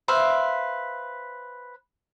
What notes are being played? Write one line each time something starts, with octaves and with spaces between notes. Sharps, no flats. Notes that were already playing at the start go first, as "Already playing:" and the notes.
B4 C5 E5 F5